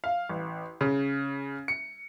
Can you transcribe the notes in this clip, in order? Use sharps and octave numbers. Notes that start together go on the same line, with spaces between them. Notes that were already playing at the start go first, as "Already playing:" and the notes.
F5
A1
C#3
C#7